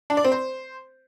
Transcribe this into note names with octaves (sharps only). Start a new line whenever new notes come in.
D4
D5
C4
C5